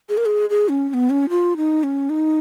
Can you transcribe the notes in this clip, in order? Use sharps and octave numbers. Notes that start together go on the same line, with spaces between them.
G#4
A#4
G#4
G#4
C#4
C#4
B3
C#4
F4
D#4
C#4
D#4